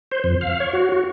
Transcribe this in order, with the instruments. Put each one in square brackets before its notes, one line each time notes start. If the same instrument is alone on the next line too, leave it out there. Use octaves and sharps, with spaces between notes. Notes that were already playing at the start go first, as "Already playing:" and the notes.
[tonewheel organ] C5
F2
F5
C#5
F#4
F#4